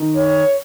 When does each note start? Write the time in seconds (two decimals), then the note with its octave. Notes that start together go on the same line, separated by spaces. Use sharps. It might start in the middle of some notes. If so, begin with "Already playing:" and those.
Already playing: D#3
0.15 C#5